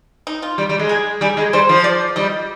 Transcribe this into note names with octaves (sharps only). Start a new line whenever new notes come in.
D#4
F4
G3
G3
G#3
G#4
G3 G#4
G#3
G3 C5
F3
D5
G3 D#5